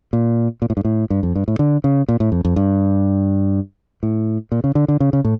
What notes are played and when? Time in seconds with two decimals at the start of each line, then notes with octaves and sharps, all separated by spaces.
0.13 A#2
0.62 A#2
0.70 A2
0.77 G2
0.85 A2
1.10 G2
1.23 F2
1.36 G2
1.48 A2
1.59 D3
1.84 C#3
2.08 A#2
2.20 A2
2.32 F2
2.45 F2
2.56 G2
4.03 A2
4.52 A#2
4.64 C#3
4.75 D3
4.88 D3
5.00 C#3
5.13 C#3
5.25 A2